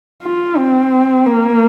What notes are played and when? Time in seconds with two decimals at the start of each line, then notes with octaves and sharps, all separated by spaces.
0.23 F4
0.57 C4
1.26 A#3